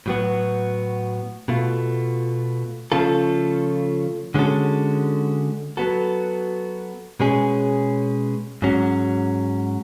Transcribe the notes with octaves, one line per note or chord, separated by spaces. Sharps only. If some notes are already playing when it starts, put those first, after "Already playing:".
A2 F#3 B3 F#4
B2 A3 F4
C#3 F3 A3 F4 A4
D3 G#3 C#4 F#4 A4
F#3 B3 F#4 A4
B2 G#3 C#4 G#4
G#2 F#3 C#4